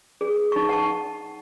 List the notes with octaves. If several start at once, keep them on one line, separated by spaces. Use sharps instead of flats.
G#4
D#4 C#6
F#5 A5 C#6